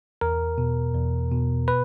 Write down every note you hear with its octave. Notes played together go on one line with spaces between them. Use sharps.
E2 A#4
B2
E2
B2
B4